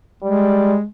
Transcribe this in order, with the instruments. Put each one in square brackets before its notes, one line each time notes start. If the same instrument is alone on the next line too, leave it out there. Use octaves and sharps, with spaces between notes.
[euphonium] G3 [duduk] G#3